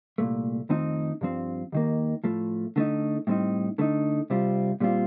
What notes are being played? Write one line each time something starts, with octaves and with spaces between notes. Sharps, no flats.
C2 A#2 A3
F2 D#3 A3 C4 D#4
G2 F3 C4
D#2 D#3 A#3
A2 F3 A3
D3 A3 D#4
A2 G3 C4 D#4
D3 A3 D#4
C3 G3 C4 F4
A#2 G3 C4 F4